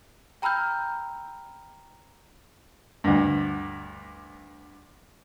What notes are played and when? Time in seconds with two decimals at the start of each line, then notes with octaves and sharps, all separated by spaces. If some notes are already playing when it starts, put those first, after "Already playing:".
0.42 G5 A#5 B5 E6 F6 G6
3.04 D2 G2